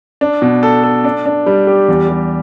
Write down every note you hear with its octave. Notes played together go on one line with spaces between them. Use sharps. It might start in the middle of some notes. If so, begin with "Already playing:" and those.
D4
B2
A4
A4
D4
D4
G3
G4
E2
G3